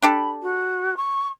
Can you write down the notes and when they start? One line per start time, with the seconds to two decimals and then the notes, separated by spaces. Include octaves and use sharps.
0.02 D4 G4 A4 B5
0.42 F#4
0.96 C#6